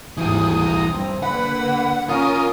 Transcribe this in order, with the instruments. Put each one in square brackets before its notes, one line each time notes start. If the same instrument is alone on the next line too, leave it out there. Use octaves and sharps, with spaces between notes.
[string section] G#1 D#2 [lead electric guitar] E3 G3 [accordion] D#6
[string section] B1 A#5
[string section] G2 [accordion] C4
[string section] D3 A#3 [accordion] B4 B5 [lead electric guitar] F#5
[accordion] C#4 A#4 D#6 [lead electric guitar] F4 F5